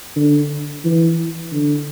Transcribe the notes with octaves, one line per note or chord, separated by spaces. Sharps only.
D3
E3
D3